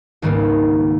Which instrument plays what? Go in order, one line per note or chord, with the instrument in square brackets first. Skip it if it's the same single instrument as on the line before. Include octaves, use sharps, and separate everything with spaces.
[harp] C#2 G#2 D#3 G3 A#3 B3